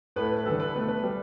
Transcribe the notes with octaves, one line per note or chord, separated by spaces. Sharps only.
A2 A3 B4
B4
D3 G3 A4
B4
B2 A3
B4
G3